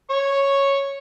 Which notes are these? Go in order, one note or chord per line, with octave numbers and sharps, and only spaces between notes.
C#5 C#6